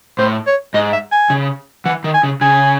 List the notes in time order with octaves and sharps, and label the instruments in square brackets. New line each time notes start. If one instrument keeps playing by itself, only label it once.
[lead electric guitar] A2 [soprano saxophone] C5
[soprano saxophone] C#5
[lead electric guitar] G#2 [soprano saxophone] D#5
[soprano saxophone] E5
G#5
[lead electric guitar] C#3
[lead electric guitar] E3 [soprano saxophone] F#5
[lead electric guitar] D#3
[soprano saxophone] G#5
[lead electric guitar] C#3
[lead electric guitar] C#3 [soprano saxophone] G#5